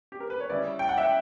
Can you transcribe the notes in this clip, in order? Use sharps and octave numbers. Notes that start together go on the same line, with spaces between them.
G4
A#4
B4
C#5
C#3 G3 C#4 E4 D5
G5
F#5
E5